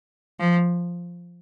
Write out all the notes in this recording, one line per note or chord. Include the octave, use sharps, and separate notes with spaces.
F3